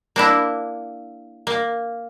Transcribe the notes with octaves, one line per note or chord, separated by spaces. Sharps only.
A#3 D4 E4
A#3